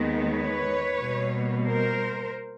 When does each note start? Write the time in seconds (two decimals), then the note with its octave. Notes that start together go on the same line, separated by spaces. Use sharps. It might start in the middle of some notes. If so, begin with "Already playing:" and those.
Already playing: D#2 D#3 G#3 B3
0.30 B4 C#5
0.99 B2 G3 A#3
1.67 A#4 C5